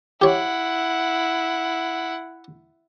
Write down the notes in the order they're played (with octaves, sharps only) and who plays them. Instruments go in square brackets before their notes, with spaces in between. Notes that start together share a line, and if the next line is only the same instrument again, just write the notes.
[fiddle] E4 F#5 [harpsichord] G4 C#5